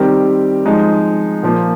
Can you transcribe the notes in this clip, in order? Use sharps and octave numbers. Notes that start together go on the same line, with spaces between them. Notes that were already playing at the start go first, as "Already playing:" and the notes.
Already playing: D#3 G3 C4 G4 A#4
F3 G#3 D#4
A#2 F3 A#3